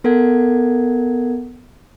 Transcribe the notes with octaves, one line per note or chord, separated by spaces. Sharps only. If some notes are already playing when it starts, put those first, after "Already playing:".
B3 A4 A#4 F#5 G#6